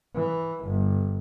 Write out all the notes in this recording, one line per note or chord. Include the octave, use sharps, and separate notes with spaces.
E3
G1